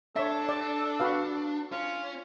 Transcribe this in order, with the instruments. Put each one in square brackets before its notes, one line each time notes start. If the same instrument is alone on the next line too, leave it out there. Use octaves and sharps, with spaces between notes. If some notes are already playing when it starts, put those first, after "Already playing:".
[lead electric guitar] D4 [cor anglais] A4 [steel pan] C#5 E5
[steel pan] D5
F#4 B4 F5
[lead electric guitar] C#4 [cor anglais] F4